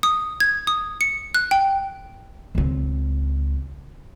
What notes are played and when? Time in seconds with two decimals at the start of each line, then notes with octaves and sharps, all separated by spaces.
0.03 D#6
0.40 G#6
0.67 D#6
1.01 C#7
1.35 F#6
1.51 G5
2.55 C#2 C4